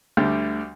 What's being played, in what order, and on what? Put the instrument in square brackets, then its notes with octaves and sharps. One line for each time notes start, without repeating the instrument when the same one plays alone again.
[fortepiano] D2 D3 G3